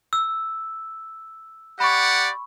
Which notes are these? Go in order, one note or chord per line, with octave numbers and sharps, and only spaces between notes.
E6
G4 D5 F#5 B5 C#6